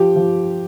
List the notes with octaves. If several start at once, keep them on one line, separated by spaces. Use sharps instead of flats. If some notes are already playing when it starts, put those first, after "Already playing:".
Already playing: F3 G4
F3